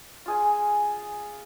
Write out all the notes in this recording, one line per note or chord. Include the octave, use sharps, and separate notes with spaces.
F4 G#4 G#5